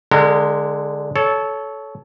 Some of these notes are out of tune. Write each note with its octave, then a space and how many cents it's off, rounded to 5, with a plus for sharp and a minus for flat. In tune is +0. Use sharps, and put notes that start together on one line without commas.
D3 +0 G#3 +0 A#4 -40
A4 -20 C#5 +10